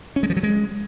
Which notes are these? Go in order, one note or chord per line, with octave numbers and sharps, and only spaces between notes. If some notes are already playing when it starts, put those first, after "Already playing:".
C#4
G#3
F3
F#3
G#3